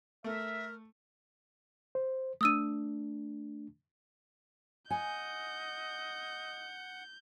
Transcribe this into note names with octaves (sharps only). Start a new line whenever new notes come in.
A3 A#4 E5
C5
A3 D4 D#6 E6 D#7
D#5 F#5 G#5 G6